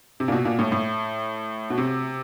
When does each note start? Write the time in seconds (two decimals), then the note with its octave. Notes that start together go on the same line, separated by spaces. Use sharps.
0.20 C3
0.28 A#2
0.32 B2
0.45 A#2
0.59 A2
0.72 A2
1.70 B2
1.78 C3